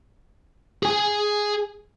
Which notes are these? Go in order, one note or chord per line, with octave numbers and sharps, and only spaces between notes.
G#4 G#5